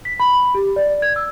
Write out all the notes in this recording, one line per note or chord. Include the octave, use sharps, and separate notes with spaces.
B6
B5
B5
G4
D5
G#6
E6